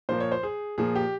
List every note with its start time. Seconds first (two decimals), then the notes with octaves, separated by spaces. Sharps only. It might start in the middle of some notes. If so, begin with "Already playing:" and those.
0.09 A#2 F3 A#3 C5
0.20 C#5
0.32 C5
0.43 G#4
0.78 A#2 F3 A#3 G#4
0.95 G4